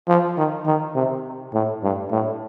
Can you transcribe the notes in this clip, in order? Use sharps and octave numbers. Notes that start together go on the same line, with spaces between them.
F3
D#3
D#3
C3
A2
G2
A2